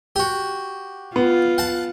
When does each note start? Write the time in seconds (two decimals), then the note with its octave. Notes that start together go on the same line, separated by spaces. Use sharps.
0.16 F#4 G4
1.16 B3 F4
1.58 F#5 A5